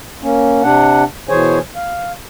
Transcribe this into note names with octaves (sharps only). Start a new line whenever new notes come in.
A#3 C#4
C3 D4 F#5
B2 E3 G#4 C5 C#5 G#5
F5